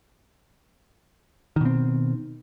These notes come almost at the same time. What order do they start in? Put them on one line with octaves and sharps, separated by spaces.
D#3 B2 C4